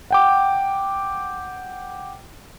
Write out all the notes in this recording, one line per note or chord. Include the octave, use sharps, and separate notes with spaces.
F#5 G5 D6